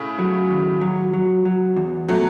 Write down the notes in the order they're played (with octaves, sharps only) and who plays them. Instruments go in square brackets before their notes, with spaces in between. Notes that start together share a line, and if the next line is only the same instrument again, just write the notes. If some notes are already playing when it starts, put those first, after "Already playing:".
Already playing: [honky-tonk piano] A2 C#3
[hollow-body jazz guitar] F#3
D#2
F#3
F#3
F#3
E2
[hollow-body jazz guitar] B2 [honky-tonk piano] F#3 A3